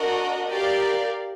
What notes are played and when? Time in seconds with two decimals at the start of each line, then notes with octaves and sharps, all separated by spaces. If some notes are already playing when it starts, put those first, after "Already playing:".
Already playing: D4 F#4 A#4 D#5
0.50 G4 A#4 D5 F5